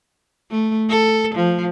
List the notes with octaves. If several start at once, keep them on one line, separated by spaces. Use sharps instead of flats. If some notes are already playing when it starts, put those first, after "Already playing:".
A3
A4
F3